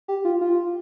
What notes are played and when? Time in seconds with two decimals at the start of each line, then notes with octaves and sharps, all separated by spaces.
0.08 G4
0.25 F4
0.41 F4